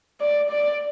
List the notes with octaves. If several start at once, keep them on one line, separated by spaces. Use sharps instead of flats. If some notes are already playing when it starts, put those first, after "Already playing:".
D5
D5